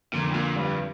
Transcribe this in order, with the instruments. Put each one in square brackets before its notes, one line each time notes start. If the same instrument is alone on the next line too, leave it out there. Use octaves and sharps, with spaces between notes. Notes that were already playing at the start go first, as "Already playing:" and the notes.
[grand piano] F2 D3 F3 [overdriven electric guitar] A#2
[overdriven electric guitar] A2
A#2
G2